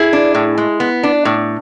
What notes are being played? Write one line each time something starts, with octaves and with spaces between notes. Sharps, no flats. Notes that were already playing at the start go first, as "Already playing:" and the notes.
Already playing: E4 G#4
D4
A2
G#3
B3
D4
A2